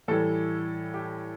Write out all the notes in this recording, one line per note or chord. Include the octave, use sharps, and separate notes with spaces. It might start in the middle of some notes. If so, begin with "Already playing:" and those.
A2 E3 G3 A4
G4